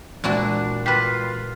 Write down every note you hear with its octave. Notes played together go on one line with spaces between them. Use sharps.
A#2 E3 G#3 D4 E4 F#4
F4 G4 B4